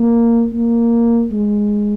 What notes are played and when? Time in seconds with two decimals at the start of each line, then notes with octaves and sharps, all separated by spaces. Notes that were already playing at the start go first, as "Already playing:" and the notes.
Already playing: A#3
0.53 A#3
1.32 G#3